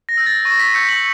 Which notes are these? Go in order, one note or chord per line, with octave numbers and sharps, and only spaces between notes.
A#6
E6 G6
A6
C#6 A#6
B6
E6 G6 C#7
F#7